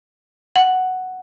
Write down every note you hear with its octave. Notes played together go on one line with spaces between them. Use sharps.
F#5